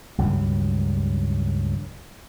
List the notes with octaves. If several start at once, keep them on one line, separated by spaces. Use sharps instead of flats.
C#2 G2 D#3 F#3